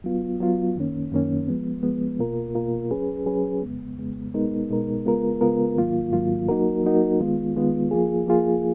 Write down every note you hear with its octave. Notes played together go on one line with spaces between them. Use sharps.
F#3 B3 F4
F#3 B3 F4
F#2 D#3 A#3 C#4
F#2 D#3 A#3 C#4
F3 G#3 B3
F3 G#3 B3
B2 A#3 F4 A#4
B2 A#3 F4 A#4
F#3 C#4 G#4 B4
F#3 C#4 G#4 B4
F2 C#3 G#3 B3
F2 C#3 G#3 B3
B2 G#3 B3 D#4 A#4
B2 G#3 B3 D#4 A#4
C#3 G#3 B3 F4 A#4
C#3 G#3 B3 F4 A#4
G#2 D#3 F#3 A#3 F4
G#2 D#3 F#3 A#3 F4
F#3 A#3 D#4 F#4 A#4
F#3 A#3 D#4 F#4 A#4
D#3 G#3 B3 F4
D#3 G#3 B3 F4
F3 A#3 F4 G#4
F3 A#3 F4 G#4